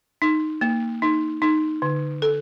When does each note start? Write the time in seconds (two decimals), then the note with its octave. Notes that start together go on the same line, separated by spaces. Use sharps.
0.22 D#4
0.61 A#3
1.02 D#4
1.42 D#4
1.82 D3
2.22 A4